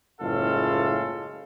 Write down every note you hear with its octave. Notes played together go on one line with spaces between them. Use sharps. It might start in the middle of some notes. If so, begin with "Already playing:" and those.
F#1 A2 G#3 F4 A4 F5